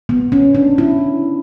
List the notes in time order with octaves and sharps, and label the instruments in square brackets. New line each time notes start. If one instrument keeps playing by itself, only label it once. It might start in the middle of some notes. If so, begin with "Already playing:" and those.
[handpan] B3
C#4
D4
E4